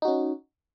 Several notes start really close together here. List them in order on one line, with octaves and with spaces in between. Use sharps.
D#4 F#4 C#4